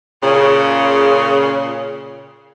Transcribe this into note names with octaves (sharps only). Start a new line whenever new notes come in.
A#2 C#3